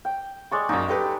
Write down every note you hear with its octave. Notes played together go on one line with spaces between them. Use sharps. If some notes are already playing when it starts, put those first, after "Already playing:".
G5
G#3 D5 C#6
A#1 F#2 D#4 D5
G4 A4 B4